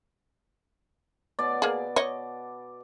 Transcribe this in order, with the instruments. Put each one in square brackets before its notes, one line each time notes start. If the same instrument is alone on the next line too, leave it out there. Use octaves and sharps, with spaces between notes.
[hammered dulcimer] B2 D5
[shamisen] A#3 G#4
C#5 D#5